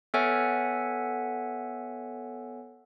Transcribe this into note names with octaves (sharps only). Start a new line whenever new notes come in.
B3 A4 C#5 E5 F#5 G#5